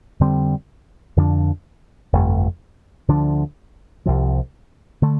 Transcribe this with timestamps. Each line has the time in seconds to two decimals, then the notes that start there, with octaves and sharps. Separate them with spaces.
0.20 F2 D3 G3 C4
1.16 F2 D3 F3 D4
2.13 G1 F2 C3 A3
3.08 D2 D3 F3 D4
4.06 C2 C3 F3
5.02 D3 A3